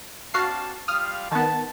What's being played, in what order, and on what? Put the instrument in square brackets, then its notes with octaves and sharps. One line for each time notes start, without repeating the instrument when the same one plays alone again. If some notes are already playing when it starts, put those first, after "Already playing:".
[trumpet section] C4 D4 A5 [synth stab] F#4 F5 C7
[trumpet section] G3 F4 F5 [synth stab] D#6 F6
[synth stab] D#3 B3 [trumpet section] A5